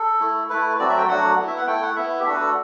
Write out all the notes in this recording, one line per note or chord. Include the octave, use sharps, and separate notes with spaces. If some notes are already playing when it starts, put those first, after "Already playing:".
Already playing: A4
A3 E4
A3 E4 B4
F#3 A3 C4 F#4 D5
E5
G5
F#3 A3 D4 F#4 F#5
B3 E4
E5
F#5
A3 E4 G5
F#5
B3 E4 E5
G4
A3 D4 F#4 A4
B4
A4